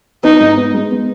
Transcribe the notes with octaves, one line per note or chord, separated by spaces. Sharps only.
B3 D#4
G#2
B3
G#3
B3